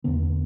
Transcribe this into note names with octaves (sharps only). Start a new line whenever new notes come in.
E2 D3 B3